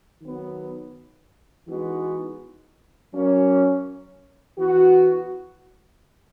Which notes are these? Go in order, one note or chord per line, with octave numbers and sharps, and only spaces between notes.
D#3 F#3 B3
E3 G#3 B3 D#4 F#4
F#3 A#3 C#4
E3 B3 F#4